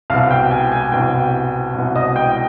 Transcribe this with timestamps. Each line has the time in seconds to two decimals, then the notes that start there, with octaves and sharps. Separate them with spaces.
0.10 C2 F5
0.14 B2
0.31 G5
0.51 G#5
0.72 G#5
0.92 C2 B2 G5
1.75 C2 B2
1.96 D#5
2.16 G5